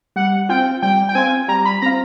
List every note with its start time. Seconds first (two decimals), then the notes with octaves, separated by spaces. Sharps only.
0.16 G3 F#5
0.49 C4 F4 G5
0.82 G3 G5
1.09 G5
1.15 C4 F4 G#5
1.48 G3 A#5
1.65 B5
1.82 C4 F4 A#5